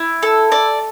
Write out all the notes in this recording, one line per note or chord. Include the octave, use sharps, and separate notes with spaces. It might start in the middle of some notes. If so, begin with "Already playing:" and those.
Already playing: E4
A4
D5